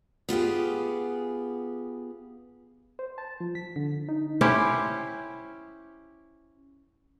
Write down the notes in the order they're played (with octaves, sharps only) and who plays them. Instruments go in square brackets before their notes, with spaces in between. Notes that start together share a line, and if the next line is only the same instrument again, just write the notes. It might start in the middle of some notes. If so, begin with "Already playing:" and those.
[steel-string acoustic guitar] B3 F4 G4 G#4
[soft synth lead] C5
A5
F3
B6
D3
D#4
[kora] C#4 E4 G4 C5